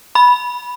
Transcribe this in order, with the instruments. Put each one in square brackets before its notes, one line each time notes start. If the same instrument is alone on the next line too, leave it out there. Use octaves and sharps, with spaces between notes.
[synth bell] B5